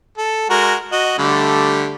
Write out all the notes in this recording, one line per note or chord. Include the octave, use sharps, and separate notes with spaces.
A4
G#3 F#4 A#4
F#4 D#5
D3 G3 A3